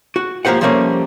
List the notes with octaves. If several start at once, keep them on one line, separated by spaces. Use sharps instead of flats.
F#4
G#2 F3 A#3 G4 C5 F#5
F3 G3 A3 A#3 C#4 C5